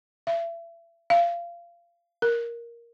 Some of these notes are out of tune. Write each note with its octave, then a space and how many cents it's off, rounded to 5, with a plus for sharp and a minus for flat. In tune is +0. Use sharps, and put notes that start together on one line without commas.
E5 +35
F5 -25
A#4 +5